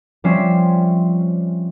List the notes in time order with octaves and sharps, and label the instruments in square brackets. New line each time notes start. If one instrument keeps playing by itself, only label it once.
[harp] F3 G3 C4 C#4 E5 C7